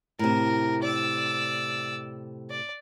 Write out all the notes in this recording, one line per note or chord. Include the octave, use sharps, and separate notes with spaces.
A2 C3 A#4
D5 E6
D5